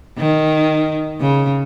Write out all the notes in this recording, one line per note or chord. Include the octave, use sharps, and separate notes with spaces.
D#3
C#3